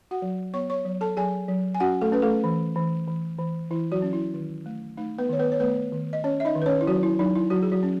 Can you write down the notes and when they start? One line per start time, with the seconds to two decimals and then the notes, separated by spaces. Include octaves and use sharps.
0.11 F#4 F#5
0.22 F#3
0.54 B3 C#5 C#6
0.70 C#5 C#6
0.85 F#3
1.01 A4 A5
1.17 F#3 G#4 G#5
1.48 F#3
1.75 G#5
1.80 C#4 F#4 F#5
2.01 A3 A4
2.12 C#4 B4
2.22 A3 A4
2.44 E3
2.76 E3
3.07 E3
3.38 E3
3.71 E3 E4
3.92 F#3 F#4
4.02 C#4
4.13 E4
4.34 D#3
4.66 A3
4.97 A3 D#4
5.18 B3 B4
5.29 D#3 C#5
5.39 B3 B4
5.52 C#5
5.60 A3 B3 B4
5.92 D#3
6.13 D#5
6.24 C#4 C#5
6.40 E5
6.45 D#4 D#5
6.56 D#3
6.62 B4
6.66 C#4 C#5
6.81 E4
6.87 F#3 F#4
7.03 E4
7.19 F#3 D#4
7.35 E4
7.50 F#3 F#4
7.62 G#4
7.72 F#3 F#4
7.83 C#4